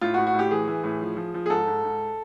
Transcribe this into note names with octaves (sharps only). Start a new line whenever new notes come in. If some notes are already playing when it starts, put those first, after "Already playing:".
A2 F4
F#4
A2
F#4
A2 G4
E3 G#4
E3
A2
F3
F3
F3
G#4
G#2 A4
G#2
G#2